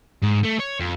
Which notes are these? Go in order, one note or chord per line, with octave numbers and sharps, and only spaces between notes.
G#2
A3
C#5
F2